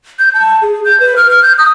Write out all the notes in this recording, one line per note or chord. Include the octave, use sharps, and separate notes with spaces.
G6
A5
G#4
G6
B4
F6
F6
G6
D#6